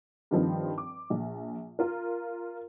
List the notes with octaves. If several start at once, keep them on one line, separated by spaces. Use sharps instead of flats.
G2 D#3 F3 C4
D6
A#1
F4 A#4